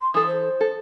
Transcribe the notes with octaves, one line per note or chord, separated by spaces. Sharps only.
C6
E3 A4 D#6
C5
A4